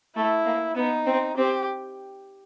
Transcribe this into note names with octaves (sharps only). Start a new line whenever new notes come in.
A3 E4
A#3
B3 D#4
C4
C4 G4